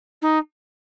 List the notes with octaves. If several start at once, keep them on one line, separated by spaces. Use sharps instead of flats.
D#4